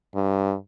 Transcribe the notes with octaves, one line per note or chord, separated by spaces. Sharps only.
G2